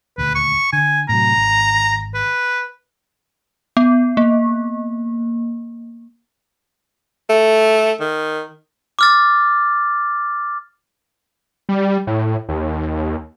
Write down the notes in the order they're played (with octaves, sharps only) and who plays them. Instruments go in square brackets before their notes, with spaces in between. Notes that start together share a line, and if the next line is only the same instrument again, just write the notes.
[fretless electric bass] D#1 D2 [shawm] B4
[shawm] C#6
[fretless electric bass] D3 [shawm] G#5
[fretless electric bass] A2 C3 F#3 [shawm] A#5
[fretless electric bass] G#1
[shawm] B4
[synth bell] B3
A#3
[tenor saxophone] A3
D#3
[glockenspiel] D6 F6 A6
[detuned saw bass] G3
A2
D#2